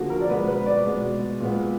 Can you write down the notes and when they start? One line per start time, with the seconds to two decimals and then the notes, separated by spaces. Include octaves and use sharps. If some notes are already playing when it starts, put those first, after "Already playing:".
Already playing: D3 F3 A#3 F#4 G#4
0.10 A#4
0.21 D5
0.29 B2 G#3 B3 B4
0.48 B4
0.66 D5
0.84 B2 G#3 B3
1.40 A#2 G#3 B3